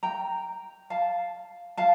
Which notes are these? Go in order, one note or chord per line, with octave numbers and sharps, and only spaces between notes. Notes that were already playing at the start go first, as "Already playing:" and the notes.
G5 A#5
F5 A5
F5 A5